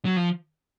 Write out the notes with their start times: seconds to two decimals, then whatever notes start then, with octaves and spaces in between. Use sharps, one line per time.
0.05 F#3
0.17 F3